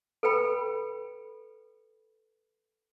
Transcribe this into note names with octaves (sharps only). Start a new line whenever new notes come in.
A4 B4 G5 B5